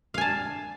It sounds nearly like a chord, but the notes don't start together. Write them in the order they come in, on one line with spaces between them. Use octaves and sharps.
F5 G#5 A5